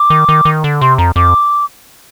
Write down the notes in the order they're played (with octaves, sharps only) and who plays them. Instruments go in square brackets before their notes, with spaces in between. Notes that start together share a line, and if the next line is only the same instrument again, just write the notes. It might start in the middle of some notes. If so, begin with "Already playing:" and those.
Already playing: [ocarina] D6
[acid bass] D#3
D#3
D#3
D3
[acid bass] C3 [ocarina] C6
[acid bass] F2 [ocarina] A#5
[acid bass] F2 [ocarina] D6